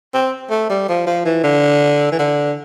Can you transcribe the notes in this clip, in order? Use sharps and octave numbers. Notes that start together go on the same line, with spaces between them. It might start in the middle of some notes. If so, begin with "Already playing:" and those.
C4
A3
G3
F3
F3
E3
D3
E3
D3